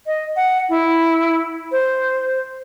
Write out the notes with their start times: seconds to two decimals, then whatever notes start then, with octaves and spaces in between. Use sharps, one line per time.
0.06 D#5
0.36 F#5
0.69 E4
1.72 C5